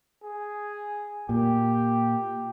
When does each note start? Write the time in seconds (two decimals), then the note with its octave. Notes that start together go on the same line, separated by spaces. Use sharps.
0.24 G#4
1.29 A#2 G4